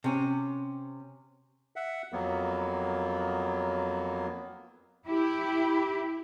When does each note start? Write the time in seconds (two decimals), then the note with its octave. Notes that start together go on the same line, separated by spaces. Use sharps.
0.04 C3 C#4
1.76 E5 F#5
2.13 F2 F#3 A#3 B3
5.06 E4 G4